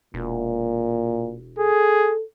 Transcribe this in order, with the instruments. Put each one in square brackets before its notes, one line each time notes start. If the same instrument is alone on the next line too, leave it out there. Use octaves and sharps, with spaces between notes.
[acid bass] E1 [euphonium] A#2
[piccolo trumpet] G#4 [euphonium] A4